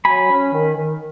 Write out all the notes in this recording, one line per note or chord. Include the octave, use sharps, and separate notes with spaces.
F#3 G#5 B5
C#4
D#3
D#3